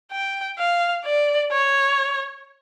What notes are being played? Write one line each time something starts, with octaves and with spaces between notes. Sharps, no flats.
G5
F5
D5
C#5